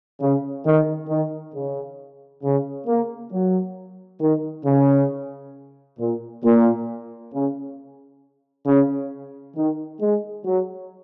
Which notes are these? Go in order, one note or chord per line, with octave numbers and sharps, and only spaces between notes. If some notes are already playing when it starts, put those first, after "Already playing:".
C#3
D#3
D#3
C#3
C#3
A#3
F#3
D#3
C#3
A#2
A#2
C#3
C#3
D#3
G#3
F#3